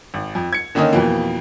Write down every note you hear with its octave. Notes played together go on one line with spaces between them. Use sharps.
G#1
F2
G#6 C#7
D3 D#3 A#3 C#4 D#4
F2 B2 E3 F3 A#3